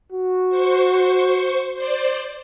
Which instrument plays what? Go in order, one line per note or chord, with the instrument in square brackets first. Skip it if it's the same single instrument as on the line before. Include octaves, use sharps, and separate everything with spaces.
[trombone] F#4
[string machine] C5 C#6
C5 D5